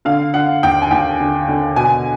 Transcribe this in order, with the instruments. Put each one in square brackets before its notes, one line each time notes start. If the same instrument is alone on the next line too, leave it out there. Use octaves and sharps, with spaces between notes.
[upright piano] D3 F5
D3 F#5
D#2 G5
G#5
D#2 G5
D3
D3
B2 G#5